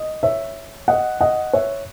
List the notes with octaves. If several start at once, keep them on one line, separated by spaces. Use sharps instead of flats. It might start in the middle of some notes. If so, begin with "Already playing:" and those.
Already playing: D#5
C#5 E5
D#5 F#5
D#5 F#5
C#5 E5